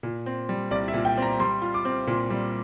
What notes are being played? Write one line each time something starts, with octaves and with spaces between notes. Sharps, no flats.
A#2
C4
G3
C2 D5
E5
A#2
G5
C4 A#5
G3 C6
F4
D6
C4
A#2
G3